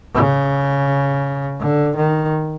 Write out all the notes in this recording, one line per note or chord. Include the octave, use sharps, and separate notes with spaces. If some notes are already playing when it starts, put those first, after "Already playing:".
C#3
D3
D#3